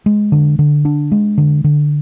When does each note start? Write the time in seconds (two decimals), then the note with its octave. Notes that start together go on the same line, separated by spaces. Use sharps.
0.06 G#3
0.32 D3
0.59 D3
0.85 D4
1.12 G#3
1.38 D3
1.64 D3